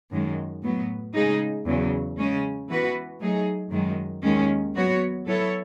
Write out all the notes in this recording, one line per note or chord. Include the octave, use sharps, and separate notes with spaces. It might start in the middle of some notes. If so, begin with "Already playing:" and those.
F#2 D#3 G#3
A2 F#3 B3
C#3 G#3 D#4 G#4
E2 C#3 F#3
C#3 G#3 C#4
E3 B3 F#4 B4
F#3 A3 D#4 G#4
F#2 D#3 G#3
D#2 D#3 G#3 C#4
F#3 B3 F#4 C#5
F#3 B3 E4 A4 C#5